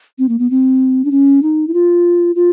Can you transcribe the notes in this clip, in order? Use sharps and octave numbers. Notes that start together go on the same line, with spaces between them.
C4
A#3
B3
C4
D4
C#4
D#4
E4
F4
F4